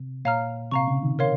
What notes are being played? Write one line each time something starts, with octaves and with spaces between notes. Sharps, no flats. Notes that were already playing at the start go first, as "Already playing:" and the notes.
Already playing: C3
A#2 C#5 F5 A#5 F6
C3 F5 A#5 C#6
C#3
D#3
A#4 C#5 F5 C6